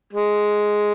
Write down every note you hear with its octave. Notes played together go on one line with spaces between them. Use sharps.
G#3